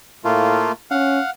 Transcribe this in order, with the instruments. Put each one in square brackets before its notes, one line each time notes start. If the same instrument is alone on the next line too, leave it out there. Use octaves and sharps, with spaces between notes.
[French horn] A2 [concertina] A3 A#3 F4
[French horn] C#4 [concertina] F5 F#5